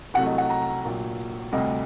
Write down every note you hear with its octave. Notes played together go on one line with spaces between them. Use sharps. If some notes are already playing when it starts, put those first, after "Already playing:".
C2 C3 F#3 A3 F#5
D#5
F#5
A#5
A#1 A#2 F#3
D2 C3 G3 D#5